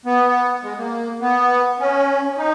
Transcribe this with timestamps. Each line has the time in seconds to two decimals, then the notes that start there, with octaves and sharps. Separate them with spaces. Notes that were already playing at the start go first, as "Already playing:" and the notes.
0.06 B3
0.63 G#3
0.78 A#3
1.21 B3
1.80 C#4
2.37 D#4